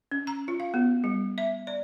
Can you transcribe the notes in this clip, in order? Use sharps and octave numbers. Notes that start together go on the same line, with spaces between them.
C#4
A#5
F4
F5
B3
G3
E5
D5